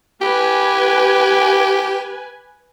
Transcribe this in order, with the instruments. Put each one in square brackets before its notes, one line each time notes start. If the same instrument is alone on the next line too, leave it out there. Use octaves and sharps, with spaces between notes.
[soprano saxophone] G4 [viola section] B4 G#5